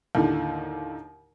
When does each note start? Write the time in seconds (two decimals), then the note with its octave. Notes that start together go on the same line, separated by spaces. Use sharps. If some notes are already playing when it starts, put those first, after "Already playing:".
0.15 D#2 A2 D3